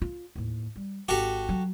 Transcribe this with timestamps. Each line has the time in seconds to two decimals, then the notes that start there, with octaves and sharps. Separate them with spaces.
0.02 F4
0.36 D#2 A2
0.76 G3
1.09 G#1 F#4 G4 A4
1.49 F#3